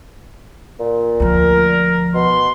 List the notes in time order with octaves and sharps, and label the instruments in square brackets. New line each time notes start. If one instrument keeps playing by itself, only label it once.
[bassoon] A#2
[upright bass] D2 F3 [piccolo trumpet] A#4
[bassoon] B2 [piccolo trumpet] C6